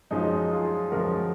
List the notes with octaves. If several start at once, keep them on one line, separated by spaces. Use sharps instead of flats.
F#2 F3 G#3 D#4
F4 G#4
F#2 F3 G#3 F#4 A#4